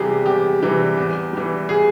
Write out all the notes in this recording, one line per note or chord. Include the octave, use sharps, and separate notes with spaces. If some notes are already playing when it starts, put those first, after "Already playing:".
Already playing: E2 C3 E3 G3 G4 G#4
E2 G4
C3 E3 G3
E2
E3 G3
G#4